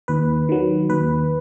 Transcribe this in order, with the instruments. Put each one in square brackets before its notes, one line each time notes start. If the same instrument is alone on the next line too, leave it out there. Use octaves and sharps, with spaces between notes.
[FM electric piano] D#2 B4
D#3 F#3
D#2 B4